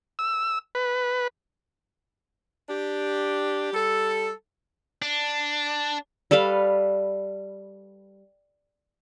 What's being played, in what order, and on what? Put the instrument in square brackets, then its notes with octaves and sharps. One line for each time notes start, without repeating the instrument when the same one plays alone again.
[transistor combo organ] E6
B4
[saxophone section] D4 G4
G3 A4
[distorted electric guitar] D4
[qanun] G3 A4 B4 F5